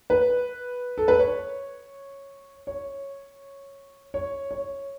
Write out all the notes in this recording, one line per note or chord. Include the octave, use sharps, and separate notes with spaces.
B4
A4
B4
C#5
C#5
C#5
C#5